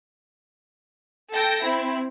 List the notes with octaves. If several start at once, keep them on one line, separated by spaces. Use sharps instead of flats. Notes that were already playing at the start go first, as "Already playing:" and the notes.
A4 G5 A#6
C4 E4